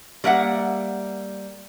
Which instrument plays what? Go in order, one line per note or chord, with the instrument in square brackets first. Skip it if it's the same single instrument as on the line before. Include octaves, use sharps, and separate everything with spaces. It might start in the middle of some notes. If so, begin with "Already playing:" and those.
[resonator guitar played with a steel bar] G3 A#3 E5 F#5